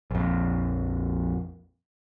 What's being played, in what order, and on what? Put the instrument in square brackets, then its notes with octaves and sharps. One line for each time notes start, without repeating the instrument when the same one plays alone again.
[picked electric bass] A#1 F2